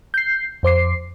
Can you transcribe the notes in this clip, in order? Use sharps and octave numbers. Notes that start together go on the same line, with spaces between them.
G6 C7
F2 C5 D6 C7